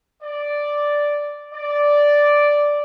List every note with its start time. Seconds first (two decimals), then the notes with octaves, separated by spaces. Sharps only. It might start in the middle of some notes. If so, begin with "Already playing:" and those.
0.23 D5
1.54 D5